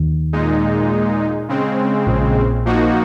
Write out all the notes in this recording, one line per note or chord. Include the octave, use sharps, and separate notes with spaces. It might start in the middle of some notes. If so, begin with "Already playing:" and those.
Already playing: D#2 D#3
A#2 G#3 D#4
C#3 G#3 C4
A#1 A#2
F3 A#3 D#4 F#4